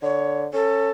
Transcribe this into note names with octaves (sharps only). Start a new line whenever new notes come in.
D3 C#5
C#4 A4